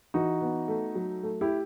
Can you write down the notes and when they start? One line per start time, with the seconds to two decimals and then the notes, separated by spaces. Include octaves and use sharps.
0.14 E3 D#4 F#4
0.41 B3
0.68 A3
0.95 F#3
1.23 A3
1.41 E4 G4